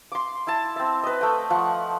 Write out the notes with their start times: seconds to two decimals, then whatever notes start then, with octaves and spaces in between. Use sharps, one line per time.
0.12 C6 D6
0.47 E4 A5
0.76 C4 E5
1.03 B4 D#5
1.21 A3 G5
1.50 F3 F#5 C#6